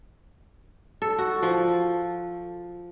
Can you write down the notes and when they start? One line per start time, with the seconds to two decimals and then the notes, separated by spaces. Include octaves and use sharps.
1.02 A4
1.18 F#4
1.43 F3